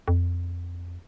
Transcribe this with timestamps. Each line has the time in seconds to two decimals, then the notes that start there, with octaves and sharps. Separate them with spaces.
0.08 F2